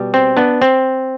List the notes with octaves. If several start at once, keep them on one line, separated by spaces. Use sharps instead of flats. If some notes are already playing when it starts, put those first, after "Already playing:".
Already playing: B2 G3
C4
B3 D4
C4